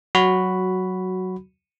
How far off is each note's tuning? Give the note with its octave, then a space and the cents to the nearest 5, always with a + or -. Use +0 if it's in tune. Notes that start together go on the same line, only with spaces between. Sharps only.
F#3 +10 F#4 +0 B5 +0